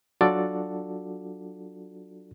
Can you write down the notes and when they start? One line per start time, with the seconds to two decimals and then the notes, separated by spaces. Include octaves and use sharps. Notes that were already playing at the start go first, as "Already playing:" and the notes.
0.21 F#3 D4 F4 F#4 A4 D5